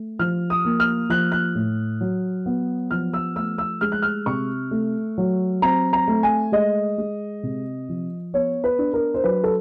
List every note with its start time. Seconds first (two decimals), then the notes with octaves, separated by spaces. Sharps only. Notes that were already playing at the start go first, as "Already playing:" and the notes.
Already playing: A3
0.19 F3 F6
0.50 D#6
0.65 A#3
0.80 F6
1.09 F3 F#6
1.32 F#6
1.55 A2
2.01 F#3
2.46 B3
2.91 F3 F6
3.14 E6
3.36 A3 E6
3.58 E6
3.81 G#3 F6
3.92 F#6
4.02 F6
4.26 C3 C#6
4.71 A3
5.18 F#3
5.62 C4 A#5
5.93 A#5
6.08 A3
6.23 G#5
6.52 G#3 D#5
6.98 G#3
7.43 C3
7.89 F3
8.34 B3 C#5
8.64 B4
8.79 D4
8.94 A#4
9.14 C5
9.24 F#3 B4
9.44 A4